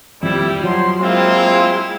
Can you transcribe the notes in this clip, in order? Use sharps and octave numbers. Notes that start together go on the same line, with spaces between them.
D#1 F2 G3 E4 G4
F3 F#3 C6
G#3 A#3 C4 E4 F4